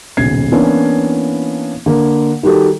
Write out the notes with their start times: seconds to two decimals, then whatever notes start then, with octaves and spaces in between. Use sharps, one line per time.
0.17 D#1 B1 C#3 G#6 C7
0.52 E3 A#3 B3 C#4 D4 E4
1.86 D3 A#3
2.43 D#3 G3 F#4 G4 A4